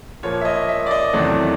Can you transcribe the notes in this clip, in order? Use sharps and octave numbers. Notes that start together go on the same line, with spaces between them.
A#2 F3 A#3 C#5
E5
D#5
E5
D5
D#5
E2 C3 D#3 F#3 A3 D5